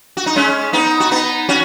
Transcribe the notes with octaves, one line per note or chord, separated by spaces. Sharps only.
F#4
D#4
G#3 C#4
B3 D#4
F#4
B3 D#4
C#4 F#4